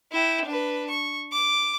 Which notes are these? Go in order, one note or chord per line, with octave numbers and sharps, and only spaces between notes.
E4 G5
D4 B4
C#6
D6